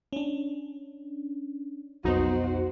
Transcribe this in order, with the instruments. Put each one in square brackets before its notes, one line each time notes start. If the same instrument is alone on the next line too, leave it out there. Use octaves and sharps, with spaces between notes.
[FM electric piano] C#4 D4
[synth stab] B1 D#4 [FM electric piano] F2 B3 [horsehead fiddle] F#4 C5